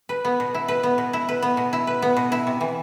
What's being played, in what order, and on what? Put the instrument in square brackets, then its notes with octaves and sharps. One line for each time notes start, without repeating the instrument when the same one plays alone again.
[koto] B4
B3
B2
E4
B4
B3
B2
E4
B4
B3
B2
E4
B4
B3
B2
E4
C3
E3